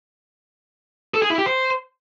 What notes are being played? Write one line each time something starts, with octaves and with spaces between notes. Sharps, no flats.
A4
G#4
E4
G4
C5